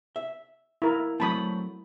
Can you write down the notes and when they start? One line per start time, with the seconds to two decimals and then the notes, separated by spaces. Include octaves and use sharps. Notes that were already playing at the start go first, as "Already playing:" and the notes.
0.16 E5
0.82 E4 A#4
1.20 F#3 A3 C4 A5 B5 D#6